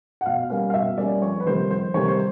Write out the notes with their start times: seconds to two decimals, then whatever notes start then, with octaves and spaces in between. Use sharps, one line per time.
0.21 F#5
0.26 B2 F5
0.50 G3 A#3 C#4 F5
0.70 F5
0.74 B2 E5
0.98 G3 A#3 C#4 D5
1.22 F2 C#5
1.40 B4
1.46 C3 D#3 G3 A#3 C5
1.70 F2 C5
1.94 C3 D#3 G3 A#3 C#5
2.08 C5